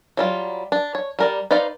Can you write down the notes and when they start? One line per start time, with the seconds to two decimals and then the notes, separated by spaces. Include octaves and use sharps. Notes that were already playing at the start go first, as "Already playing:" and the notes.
0.17 F#3 G3 F4
0.72 D4
0.95 C#5
1.19 G3 A#4 D5
1.51 D#4 B4 C5 D5 F5